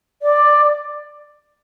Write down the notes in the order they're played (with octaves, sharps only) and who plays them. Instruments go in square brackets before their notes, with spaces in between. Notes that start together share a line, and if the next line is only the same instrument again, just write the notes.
[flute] D5